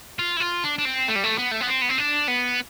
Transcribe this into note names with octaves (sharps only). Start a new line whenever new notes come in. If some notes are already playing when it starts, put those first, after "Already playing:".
F4
E4
F4
D4
D4
C4
A3
G3
A3
B3
A3
B3
C4
B3
C4
D4
B3